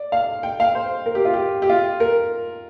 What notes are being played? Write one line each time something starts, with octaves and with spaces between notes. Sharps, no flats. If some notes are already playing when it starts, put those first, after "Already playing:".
Already playing: D5
F5
G5
F5
C5
A#4
G4
F4
G4
G4
F4
A#4